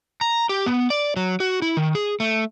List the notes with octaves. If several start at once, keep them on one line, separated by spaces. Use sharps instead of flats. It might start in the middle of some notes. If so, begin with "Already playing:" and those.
A#5
G4
B3
D5
F#3
F#4
E4
D#3
G#4
A3